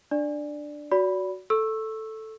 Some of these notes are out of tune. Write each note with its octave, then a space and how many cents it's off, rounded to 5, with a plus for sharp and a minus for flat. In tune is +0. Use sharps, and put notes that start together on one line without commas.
D4 +10 D5 +5
F#4 +0 D5 -35 B5 -5
A4 +0 C#6 -25 E6 +0